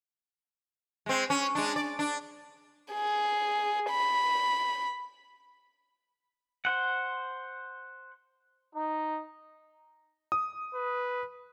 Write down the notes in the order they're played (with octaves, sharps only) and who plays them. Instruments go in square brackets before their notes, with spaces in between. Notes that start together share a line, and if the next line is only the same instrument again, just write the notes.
[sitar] G#3 C4
C#4
G#3 D4
D5
D4
[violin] G#4
B5
[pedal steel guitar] C5 F#5
[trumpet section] D#4
[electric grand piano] D#6
[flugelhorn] B4